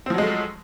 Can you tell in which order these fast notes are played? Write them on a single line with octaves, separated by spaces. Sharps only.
C4 F3 F#3 G#3 A3